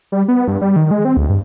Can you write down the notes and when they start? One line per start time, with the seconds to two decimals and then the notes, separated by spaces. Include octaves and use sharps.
0.12 G3
0.28 B3
0.48 G2
0.62 G3
0.76 D#3
0.91 G#3
1.05 C4
1.17 D2
1.29 G2